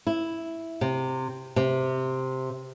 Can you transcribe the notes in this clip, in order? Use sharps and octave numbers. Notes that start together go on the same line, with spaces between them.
E4
C3
C3